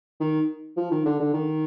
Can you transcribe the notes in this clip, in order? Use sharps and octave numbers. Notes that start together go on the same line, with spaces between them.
D#3
F3
D#3
D3
D3
D#3